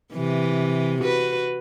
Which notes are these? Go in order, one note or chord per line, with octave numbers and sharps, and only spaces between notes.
C3 E3
F#4 B4